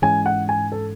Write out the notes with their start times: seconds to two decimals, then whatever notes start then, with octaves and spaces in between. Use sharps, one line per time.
0.02 G#2 E3 G#3 C#4 G#5
0.26 F#5
0.49 G#5
0.72 A4